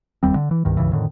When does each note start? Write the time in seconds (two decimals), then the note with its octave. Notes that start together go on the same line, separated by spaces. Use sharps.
0.23 F1 D#2 G3 C4
0.36 D3
0.51 E3
0.65 C2 G2 D#3
0.77 C#2 G2 C#3 E3
0.93 F2 A2 D3 D#3